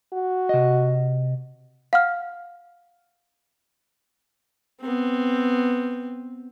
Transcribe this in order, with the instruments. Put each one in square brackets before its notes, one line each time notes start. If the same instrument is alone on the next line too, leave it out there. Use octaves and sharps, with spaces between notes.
[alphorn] F#4
[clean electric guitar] C3 D#5
[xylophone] F5 F#5 F6
[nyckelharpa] B3 C4